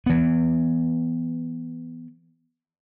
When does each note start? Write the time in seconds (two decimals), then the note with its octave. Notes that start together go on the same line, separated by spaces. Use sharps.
0.06 E3 B3